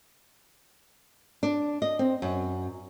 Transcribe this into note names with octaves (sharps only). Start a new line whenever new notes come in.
D4
D#5
C4
F#2